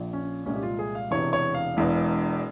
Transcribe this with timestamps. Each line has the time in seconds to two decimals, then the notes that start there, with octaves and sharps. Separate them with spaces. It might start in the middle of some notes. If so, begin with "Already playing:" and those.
Already playing: A#1 A#2 F3
0.13 C#4
0.46 C2 A#2 F3 G#3 C#4
0.55 G4
0.63 F4
0.79 G#4
0.95 F5
1.11 E1 E2 C3 E3 C#5
1.33 C#5
1.54 F5
1.77 E1 E2 E3 G#3